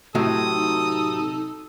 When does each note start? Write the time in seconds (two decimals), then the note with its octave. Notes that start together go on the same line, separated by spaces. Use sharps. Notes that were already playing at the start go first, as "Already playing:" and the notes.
0.15 A2 C3 F#3 E4 A4 D#6
0.56 D#4